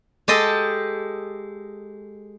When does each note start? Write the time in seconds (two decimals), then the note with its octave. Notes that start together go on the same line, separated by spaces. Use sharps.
0.28 G#3 G4 A4 D#5